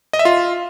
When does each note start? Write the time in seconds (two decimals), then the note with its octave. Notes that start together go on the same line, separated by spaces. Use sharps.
0.13 D#5
0.19 E5
0.25 F4